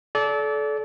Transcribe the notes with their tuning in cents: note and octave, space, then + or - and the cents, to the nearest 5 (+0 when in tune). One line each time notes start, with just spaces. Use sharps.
A4 -30 D5 -25